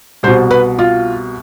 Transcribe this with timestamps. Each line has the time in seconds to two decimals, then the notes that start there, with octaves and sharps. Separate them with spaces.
0.23 C2 C5
0.28 B2
0.51 B4
0.79 F4